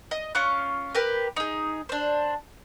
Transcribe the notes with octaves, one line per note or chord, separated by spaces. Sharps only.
D#5
C#4 F4 C#6 F#6
G4 A#4 B4
D#4 G#4
D4 C5